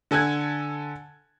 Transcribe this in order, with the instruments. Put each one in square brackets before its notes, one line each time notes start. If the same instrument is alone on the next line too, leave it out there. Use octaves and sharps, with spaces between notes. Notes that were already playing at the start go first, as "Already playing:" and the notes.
[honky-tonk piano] D3 A4 G#5 F#6 G#6